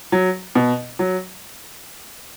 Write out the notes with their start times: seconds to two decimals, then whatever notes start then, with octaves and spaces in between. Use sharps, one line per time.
0.12 F#3
0.55 B2
0.99 F#3